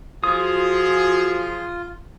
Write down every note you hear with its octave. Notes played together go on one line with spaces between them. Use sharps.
F3 F4 F#4 G#4 D#6